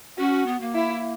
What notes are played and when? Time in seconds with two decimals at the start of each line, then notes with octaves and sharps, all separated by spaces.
0.18 C#4 F#4
0.46 B3
0.61 A#3
0.74 E4